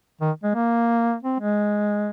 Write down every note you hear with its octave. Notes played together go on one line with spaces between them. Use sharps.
D#3
G#3
A#3
C4
G#3